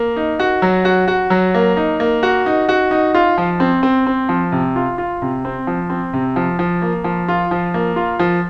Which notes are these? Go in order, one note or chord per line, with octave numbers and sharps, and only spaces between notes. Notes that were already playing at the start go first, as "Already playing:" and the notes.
Already playing: A#3
D#4
F#4
F#3
F#4
F#4
F#3
A#3
D#4
A#3
F#4
D#4
F#4
D#4
F4
F3
C4
C4
C4
F3
C3
F4
F4
C3
C4
F3
C4
C3
F3
F3
A#3
F3
F4
F3
A#3
F4
F3